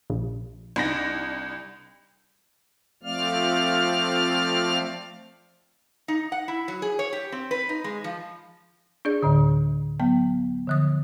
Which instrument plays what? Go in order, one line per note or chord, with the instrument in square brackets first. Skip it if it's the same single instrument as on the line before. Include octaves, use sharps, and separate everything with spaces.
[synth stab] A#1
[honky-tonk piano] C2 B5 A#6 [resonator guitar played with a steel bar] D4 D#4
[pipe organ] F3 A3 C4 D5 F5 F6
[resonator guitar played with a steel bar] D#4
F#5
E4
F#3
G#4
C#5
G4
C4
B4
D#4
G#3
F3
[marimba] D4 G#4 D5
D2 A2 D3
F#3 B3 G5
D3 F3 D#6